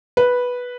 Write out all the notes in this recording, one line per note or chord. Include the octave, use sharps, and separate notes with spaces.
B4